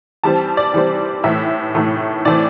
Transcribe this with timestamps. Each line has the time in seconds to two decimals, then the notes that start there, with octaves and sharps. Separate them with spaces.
0.24 E3 G3 C4 A5
0.57 D5
0.74 E3 G3 C4
1.24 A2 E3 A3 E5
1.75 A2 E3 A3
2.25 A2 E3 A3 C4 D5